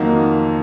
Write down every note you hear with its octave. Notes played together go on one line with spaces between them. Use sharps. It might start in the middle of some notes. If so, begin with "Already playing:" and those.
Already playing: F2 D#3 F#3 A#3 D#4